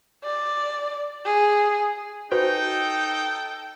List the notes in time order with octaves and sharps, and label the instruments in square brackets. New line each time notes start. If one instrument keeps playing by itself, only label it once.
[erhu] D5
G#4
[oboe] D#4 [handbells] F#4 B4 C5 [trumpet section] A4 G5